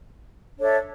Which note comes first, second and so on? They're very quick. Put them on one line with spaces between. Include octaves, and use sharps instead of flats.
D4 C#5 A4 E5